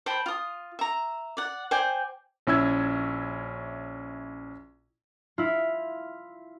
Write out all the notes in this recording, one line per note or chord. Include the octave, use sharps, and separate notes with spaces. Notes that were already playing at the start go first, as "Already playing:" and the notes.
C5 G5 A5 B5
F4 D#6
E5 A#5
D5 F#5
C5 D5 G5 G#5
A#1 C#4 E4 E6 G#6
E4 F4